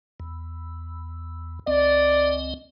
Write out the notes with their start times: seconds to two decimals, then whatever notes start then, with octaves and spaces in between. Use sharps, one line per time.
0.20 E2
1.67 C#2 C4 D5 D#5